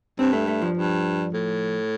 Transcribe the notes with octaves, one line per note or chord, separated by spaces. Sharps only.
G2 C4
A3
A3
F3
G2
A2